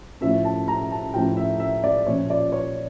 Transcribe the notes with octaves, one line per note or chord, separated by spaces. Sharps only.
A2 F3 C#4 E5
A5
A#5
A5
A2 F3 C#4 G5
E5
E5
D5
A#2 F3 C#4 C#5
D5
C#5